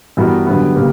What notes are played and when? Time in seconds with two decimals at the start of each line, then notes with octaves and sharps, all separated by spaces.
0.17 G2 E3 B3 F#4 A#4
0.47 G2 D3 F#3 B3
0.76 C#3 G3 A#3